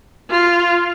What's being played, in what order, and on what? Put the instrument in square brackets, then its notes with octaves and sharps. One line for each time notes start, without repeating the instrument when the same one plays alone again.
[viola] F4